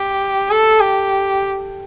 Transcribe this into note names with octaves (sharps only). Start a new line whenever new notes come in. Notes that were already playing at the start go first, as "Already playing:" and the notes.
Already playing: G4
A4
G4